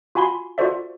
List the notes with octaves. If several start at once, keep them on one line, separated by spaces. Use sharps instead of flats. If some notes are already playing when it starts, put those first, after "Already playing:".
F4 F#4 G#5 B5 C6
F4 F#4 A4 C5 D5 E5